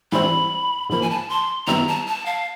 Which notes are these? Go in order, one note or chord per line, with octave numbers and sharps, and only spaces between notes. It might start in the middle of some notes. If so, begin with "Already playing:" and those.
G#2 E3 G3 C4 E4 B5
G#2 F3 A#3 B5
G#5
A5
C6
F#2 D#3 G3 B3 E4 A#5
A5
A5
F5